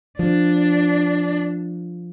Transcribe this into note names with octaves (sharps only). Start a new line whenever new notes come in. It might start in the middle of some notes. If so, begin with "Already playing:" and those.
F3 D4